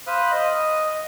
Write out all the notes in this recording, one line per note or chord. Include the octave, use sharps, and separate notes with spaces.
C5 F5 B5 D#6 F#6
D#5